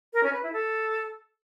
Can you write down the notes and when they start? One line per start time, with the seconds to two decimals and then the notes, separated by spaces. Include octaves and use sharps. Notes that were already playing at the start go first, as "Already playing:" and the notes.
0.14 A#4
0.23 C#4
0.33 B4
0.43 E4
0.53 A4